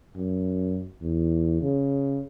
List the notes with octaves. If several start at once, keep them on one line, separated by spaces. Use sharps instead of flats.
F#2
E2
C#3